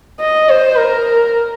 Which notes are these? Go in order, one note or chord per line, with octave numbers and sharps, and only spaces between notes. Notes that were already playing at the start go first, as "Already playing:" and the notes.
D#5
C5
A#4